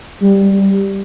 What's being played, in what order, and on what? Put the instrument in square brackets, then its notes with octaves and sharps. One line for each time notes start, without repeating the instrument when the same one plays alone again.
[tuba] G3